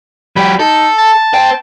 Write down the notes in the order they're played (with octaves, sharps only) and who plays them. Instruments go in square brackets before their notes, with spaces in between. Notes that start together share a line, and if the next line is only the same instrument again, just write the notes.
[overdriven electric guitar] F#3 G4 [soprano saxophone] B5
[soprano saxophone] D#4 [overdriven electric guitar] A4
[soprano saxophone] A5
[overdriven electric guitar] C5 G5